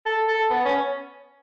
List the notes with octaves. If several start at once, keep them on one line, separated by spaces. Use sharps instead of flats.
A4
A4
B3
C#4